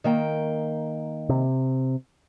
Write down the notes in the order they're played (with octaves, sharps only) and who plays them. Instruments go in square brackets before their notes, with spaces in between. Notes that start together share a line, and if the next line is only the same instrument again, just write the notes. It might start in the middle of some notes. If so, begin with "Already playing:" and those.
[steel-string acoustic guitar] D#3 A#3 G5
[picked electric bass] C3